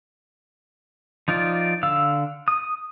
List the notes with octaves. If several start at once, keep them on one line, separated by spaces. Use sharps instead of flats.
F3 D#4 F4 D5
D3 F5 E6
D#6